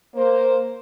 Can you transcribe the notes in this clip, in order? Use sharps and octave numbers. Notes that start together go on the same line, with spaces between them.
A#3 C5